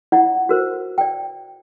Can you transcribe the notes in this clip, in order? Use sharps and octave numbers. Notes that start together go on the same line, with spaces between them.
E4 F4 D5 F#5
F#4 A#4 C5
D5 G5